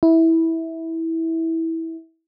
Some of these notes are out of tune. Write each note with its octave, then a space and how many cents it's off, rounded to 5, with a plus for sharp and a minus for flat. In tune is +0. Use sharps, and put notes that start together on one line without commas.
E4 -15